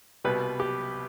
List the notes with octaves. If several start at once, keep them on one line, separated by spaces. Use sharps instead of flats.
C2 B2 G3 B4
G4